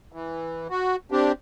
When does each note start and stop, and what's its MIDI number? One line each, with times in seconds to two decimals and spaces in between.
0.12 0.67 52
0.70 0.96 66
1.12 1.32 60
1.12 1.32 62
1.12 1.32 67